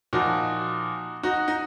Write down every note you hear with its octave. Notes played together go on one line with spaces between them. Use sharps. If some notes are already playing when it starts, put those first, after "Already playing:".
A#2 F3 D#4 F#4
D#4 F#4
D#4